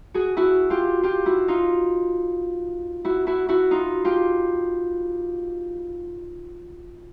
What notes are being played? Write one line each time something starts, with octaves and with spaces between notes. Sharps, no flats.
F#4 G#4
E4 F#4
F4 G4
F4 G4
E4 F#4
D#4 F4
E4 F#4
E4 F#4
E4 F#4
D#4 F4
F4 G4